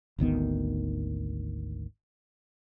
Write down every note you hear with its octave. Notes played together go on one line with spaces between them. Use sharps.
G#1 D2 D#3 B3